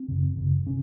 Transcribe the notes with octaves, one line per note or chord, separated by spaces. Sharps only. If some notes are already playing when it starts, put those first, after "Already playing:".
Already playing: C4
F#2 C#3
F#2 C#3
C3 C#4